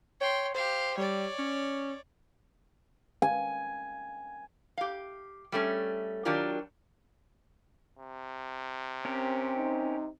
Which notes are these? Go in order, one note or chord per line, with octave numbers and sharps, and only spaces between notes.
C#5 G5 C6
G4 C5 F5
G3 C#5 D5
C#4
G#5
G4 F5
G3 A3 C#4
D#3 F#3 D4 F4 G4 A#4
C3
C4 C#4 G4 A#4
D#4